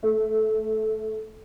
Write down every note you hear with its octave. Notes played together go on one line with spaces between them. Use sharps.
A3